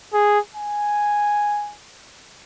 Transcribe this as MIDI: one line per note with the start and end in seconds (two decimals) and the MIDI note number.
0.13 0.39 68
0.55 1.74 80